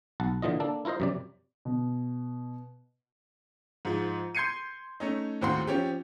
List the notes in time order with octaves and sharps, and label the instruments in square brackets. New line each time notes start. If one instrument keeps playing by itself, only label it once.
[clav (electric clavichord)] B1 F#5 A5
A#2 D3 E3 F4 D#5
A#3 D4 A4
E4 F4 A#4 C5 D#5
F#2 C3 D5
[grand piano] B2
G#2 F3
C6 G6 G#6 C7 C#7 D#7
A3 C#4 D#4
D#2 A2 C4 F#4 G5 C6
F3 C4 C#4 G4